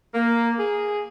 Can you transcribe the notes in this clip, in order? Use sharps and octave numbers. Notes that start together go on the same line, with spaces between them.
A#3
G#4